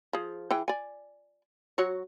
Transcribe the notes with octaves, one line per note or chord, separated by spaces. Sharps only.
F3 G#4
E3 G#4 G5
D5 G#5
F#3 F#4 C#5